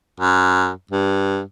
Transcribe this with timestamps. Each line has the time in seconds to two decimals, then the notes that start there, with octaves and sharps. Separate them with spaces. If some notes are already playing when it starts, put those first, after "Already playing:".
0.20 F#2
0.91 G2